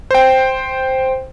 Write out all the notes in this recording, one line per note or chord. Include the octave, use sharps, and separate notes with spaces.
C5 G5